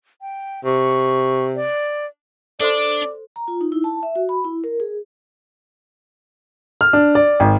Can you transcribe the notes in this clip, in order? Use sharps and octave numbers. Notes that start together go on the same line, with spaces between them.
G5
C3 C#6
D5
D4 A4 C5 D5 C6
A#5
F4
D#4
E4
A5
E5
F#4
B5
E4
A#4
G#4
F6
D4
D5
G#1